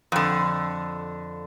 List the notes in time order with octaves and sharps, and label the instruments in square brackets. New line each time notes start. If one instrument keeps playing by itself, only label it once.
[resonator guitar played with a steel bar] F2 D3